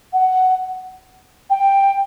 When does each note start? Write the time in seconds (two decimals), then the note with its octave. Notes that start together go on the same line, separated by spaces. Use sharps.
0.13 F#5
1.50 G5